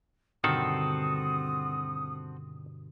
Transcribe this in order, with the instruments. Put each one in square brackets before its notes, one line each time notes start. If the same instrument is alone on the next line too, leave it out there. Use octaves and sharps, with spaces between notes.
[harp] G2 B2 D3 [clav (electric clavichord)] D#3 [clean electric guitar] C4 F#4 A4 [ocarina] D#6